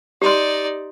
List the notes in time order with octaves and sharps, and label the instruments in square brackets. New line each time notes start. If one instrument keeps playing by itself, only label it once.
[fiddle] D#4 D5 [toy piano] G4 C6